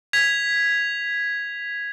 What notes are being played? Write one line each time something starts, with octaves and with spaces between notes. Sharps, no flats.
G#6 B6 F7